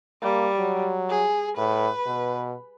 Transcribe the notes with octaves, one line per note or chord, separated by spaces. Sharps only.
G3 A#3
F#3
G#4
A2 B4
B2